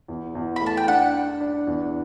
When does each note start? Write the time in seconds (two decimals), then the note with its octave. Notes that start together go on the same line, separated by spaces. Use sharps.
0.08 E2
0.35 E2
0.56 B5
0.61 A3
0.66 A5
0.77 G5
0.87 D4 F#5
1.14 D4
1.40 D4
1.67 E2